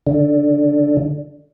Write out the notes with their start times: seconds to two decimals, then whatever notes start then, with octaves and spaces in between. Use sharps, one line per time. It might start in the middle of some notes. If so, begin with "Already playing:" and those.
0.07 D3